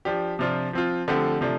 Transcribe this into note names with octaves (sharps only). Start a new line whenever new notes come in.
F3 D4 G4
C3 F3 D4 F4
F3 C4 F4
D3 F3 A3 C4 G4
C3 F3 A3 D4